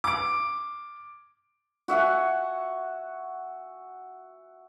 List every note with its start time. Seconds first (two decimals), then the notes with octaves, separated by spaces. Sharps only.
0.04 D6 D7
1.88 F#4 E5 F#5 G#5